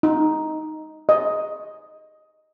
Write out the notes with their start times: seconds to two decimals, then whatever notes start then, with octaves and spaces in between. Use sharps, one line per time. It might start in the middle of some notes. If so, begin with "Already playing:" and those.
0.03 D#4
1.09 D#5